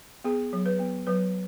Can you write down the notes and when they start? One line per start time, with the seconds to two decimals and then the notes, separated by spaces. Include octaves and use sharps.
0.24 B3 G#4
0.53 F#3
0.66 B4
0.79 B3
1.07 F#3 B4